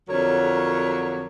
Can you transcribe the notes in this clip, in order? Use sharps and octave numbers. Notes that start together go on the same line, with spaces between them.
F2 D3 F#3 A#4 C#5